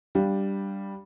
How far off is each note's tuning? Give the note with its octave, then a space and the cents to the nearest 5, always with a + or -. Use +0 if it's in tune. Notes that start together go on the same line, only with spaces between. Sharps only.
G3 +0 D4 +0 F5 +0